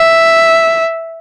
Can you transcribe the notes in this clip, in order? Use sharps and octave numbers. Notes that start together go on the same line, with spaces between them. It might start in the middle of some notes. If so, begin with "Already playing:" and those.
Already playing: E5